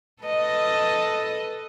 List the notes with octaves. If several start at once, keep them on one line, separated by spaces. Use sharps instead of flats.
A4 B4 D#5